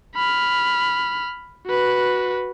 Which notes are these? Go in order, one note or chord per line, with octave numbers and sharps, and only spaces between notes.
B5 F6
F#4 B4